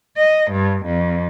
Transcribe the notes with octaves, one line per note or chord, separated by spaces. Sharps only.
D#5
G2
F2